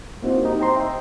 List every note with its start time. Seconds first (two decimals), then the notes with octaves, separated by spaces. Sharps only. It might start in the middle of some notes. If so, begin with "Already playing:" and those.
0.22 A#3 C4 D#4 E4 F#4 C5
0.45 D#4 G4
0.59 C5 G5 A#5 C6
0.75 D#5 E5 G5